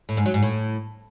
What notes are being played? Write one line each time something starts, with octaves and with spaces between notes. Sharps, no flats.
A2
G#2
F#3
G#2
A2